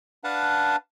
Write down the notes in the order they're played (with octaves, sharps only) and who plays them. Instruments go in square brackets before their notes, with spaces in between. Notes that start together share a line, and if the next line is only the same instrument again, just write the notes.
[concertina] D4 B4 F5 F#5 A5